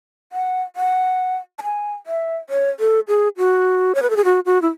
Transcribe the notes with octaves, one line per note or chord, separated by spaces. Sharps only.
F#5
F#5
A5
G#5
E5
C#5
A4
G#4
F#4
C#5
B4
A4
G#4
F#4
F#4
E4